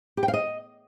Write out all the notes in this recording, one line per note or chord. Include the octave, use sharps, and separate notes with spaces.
G4
G5
F5
D#5